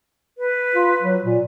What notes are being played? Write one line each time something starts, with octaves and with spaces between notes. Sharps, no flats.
B4
F4
F#3
A#2